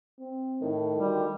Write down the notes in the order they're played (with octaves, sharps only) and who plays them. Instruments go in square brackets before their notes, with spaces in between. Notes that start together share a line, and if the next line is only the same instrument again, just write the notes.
[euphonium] C4
[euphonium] A2 [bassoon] D#3
[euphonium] D2 [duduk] G3